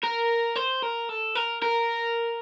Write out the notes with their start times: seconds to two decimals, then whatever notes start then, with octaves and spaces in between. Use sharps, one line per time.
0.03 A#4
0.56 C5
0.83 A#4
1.09 A4
1.36 A#4
1.62 A#4